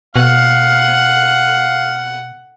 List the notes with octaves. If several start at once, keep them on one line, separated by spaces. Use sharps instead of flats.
B2 F5 F#5